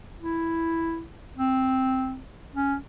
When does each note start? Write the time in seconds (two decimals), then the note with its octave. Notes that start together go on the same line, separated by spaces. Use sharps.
0.21 E4
1.37 C4
2.55 C#4